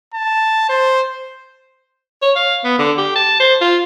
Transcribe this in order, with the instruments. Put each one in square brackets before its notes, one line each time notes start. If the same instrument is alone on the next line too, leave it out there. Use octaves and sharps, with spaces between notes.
[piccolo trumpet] A5
C5
[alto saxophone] C#5
F5
B3
D3
G4
A5
C5
F4